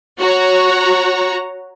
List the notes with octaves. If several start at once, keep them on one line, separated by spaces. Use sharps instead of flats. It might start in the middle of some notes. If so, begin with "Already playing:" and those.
F#4 C#5 A#5